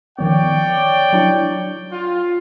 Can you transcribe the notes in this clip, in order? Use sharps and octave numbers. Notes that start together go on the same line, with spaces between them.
D#3 F3 B3 C#5 D5 G5
F#3 D4 E4
F4